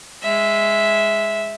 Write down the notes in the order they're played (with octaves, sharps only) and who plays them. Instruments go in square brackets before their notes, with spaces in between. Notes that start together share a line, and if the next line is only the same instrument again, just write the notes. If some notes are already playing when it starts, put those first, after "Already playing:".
[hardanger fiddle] G#3 E5